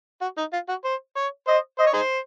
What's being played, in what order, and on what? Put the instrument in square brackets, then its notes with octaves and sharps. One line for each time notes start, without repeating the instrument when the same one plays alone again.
[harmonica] F#4
D#4
F4
F#4
C5
C#5
[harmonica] C5 [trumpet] D#5
[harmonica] C5 [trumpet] D#5
[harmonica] C#5
D#4 G#4 C5